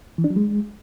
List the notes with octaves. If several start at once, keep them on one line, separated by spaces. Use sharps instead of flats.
E3
D4
F#3
G#3